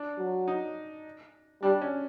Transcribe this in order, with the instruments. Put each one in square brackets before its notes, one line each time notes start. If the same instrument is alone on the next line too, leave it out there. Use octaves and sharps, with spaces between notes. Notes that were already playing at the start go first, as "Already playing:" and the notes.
Already playing: [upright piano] D4
[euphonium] F#3
[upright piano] D#4
[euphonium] G3 [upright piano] D4
[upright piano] C#4